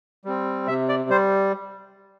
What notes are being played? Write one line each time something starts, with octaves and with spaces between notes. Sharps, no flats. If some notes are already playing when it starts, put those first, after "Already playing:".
G3 C4
C3 E5
D5
G3 C5